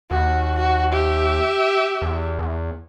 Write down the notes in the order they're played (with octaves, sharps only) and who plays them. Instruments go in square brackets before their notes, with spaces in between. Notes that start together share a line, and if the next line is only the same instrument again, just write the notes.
[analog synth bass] D#2 [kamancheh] F#4
[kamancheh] F#4
G4 E5
[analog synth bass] E2
E2